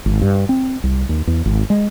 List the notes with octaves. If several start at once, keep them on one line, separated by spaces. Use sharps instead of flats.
G#1
G2
C4
C2
D#2
E2
G#1
G#3